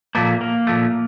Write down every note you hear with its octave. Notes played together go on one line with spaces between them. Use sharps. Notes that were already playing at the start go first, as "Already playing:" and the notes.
A#2 F3 A3 A#3
A#3
A#2 F3 A3